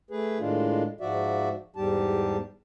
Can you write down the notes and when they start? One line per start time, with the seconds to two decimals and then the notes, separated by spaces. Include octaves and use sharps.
0.11 A3 G#4 B4
0.39 A2 D#3 G#3 D4 F4
1.01 G#2 F3 F#4 D5 E5
1.76 E2 G#2 G3 G4 A5